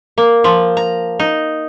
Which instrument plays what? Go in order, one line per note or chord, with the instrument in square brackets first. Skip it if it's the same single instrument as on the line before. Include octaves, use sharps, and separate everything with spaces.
[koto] A#3
F3
A#5
D#4